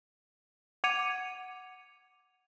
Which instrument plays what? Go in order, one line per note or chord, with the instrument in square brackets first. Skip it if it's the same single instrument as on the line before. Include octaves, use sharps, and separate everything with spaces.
[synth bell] F#5 D6 G#6 C#7 D#7 F7